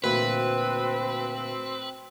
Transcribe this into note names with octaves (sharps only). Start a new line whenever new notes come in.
D2 A#2 E3 C4 F#4 B4 C5